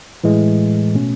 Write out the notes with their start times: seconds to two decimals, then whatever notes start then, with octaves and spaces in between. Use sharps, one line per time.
0.24 A2 E3 G#3
0.94 B2 A3 C#4